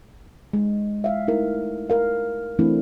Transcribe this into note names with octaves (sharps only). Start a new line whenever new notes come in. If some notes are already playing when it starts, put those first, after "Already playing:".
G#3
E5 F5
A3 D#4 E4 A#4
A#4 F5
E3 A3 C4 D4 E4